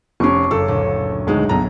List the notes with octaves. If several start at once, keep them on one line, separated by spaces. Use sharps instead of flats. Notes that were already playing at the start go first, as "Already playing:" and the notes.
F1 C#4 C#6 D6 C7
F#1 A4
D2 A#2
D2 G#3 D#4
B1 G#4 A4 A#5